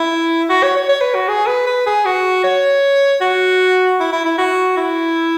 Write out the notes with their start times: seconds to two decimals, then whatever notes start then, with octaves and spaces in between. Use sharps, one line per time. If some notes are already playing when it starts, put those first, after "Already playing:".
Already playing: E4
0.50 F#4
0.63 C#5
0.77 C#5
0.89 C#5
1.01 B4
1.15 F#4
1.28 G#4
1.47 B4
1.67 B4
1.87 G#4
2.06 F#4
2.44 C#5
3.21 F#4
4.00 E4
4.13 E4
4.26 E4
4.38 F#4
4.77 E4